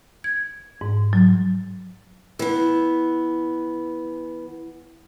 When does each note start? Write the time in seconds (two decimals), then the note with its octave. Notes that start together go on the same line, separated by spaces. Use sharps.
0.24 G#6
0.81 G#2
1.13 F#3
2.39 E3 B3